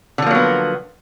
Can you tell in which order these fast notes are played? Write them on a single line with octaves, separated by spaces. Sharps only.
D3 F3 A#3 F#3 B3